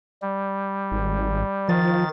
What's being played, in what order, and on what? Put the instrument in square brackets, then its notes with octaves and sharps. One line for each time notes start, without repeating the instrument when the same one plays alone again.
[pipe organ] G3
[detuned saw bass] G#1
[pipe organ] D#3 A6 [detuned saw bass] F3